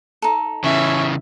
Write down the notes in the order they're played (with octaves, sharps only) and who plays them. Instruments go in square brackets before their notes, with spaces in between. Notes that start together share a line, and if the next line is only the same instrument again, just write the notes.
[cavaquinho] D#4 A4
[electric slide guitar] C#3 E3 [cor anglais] C#4 [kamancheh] E5